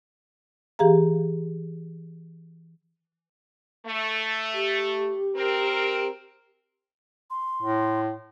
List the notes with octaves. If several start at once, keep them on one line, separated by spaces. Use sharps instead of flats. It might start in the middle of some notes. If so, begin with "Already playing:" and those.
E3 G4 G#4 F5 A#5
A3
G4
C4 A#4
C6
A2